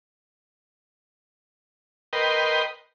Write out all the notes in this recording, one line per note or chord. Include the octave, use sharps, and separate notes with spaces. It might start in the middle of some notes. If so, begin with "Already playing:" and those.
A#4 B4 D#5 G5 C6